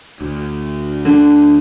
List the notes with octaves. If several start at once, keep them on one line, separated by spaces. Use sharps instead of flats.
D2
D3